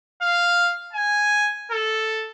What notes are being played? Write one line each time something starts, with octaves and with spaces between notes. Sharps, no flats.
F5
G#5
A4